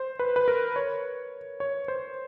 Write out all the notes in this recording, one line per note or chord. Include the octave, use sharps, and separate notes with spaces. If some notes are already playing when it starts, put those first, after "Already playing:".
Already playing: C5
B4
B4
A#4
C#5
C#5
C5